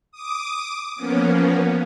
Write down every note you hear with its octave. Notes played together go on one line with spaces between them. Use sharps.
D6 D#6
F3 A#3 B3 C#4